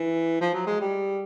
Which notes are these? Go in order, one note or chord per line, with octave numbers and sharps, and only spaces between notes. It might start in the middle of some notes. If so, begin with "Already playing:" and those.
Already playing: E3
F3
F#3
G#3
G3